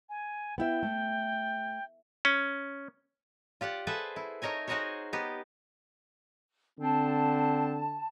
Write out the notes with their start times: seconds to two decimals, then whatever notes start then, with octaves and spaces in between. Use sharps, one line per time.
0.09 G#5
0.58 B3 E4 E5 G5
0.83 A3
2.25 C#4
3.61 F4 G4 D5 F#5
3.87 G#4 A4 B4 C5 E5 F#5
4.16 E4
4.42 A3 D#4 A#4 C#5 G#5
4.67 D#4 F#4 G#4 A#4 C5 C#5
5.13 B3 D#4 G4
6.79 D3 C4 A5